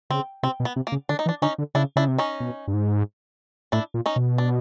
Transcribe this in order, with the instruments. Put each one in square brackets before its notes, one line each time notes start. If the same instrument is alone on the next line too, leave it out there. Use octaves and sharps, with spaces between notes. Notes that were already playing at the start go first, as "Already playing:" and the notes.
[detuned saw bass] C#3 [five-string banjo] C4
[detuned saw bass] C3 [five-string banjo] C4
[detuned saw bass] B2
[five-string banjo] B3
[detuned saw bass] C3
[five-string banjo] A#3
[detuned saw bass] C#3
[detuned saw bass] D3 [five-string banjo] D4
[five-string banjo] D#4
[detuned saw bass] E3
[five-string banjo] D4
[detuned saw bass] D3 [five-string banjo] C#4 D#4
[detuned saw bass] D3
[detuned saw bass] C#3 [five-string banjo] D4 E4
[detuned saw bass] C#3 [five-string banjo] D4 E4
[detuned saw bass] C3
[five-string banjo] C#4 D#4
[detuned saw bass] B2
G2
G#2
[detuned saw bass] A2 [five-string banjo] D4 E4
[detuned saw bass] A#2
[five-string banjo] C#4 D#4
[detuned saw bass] B2
[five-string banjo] D4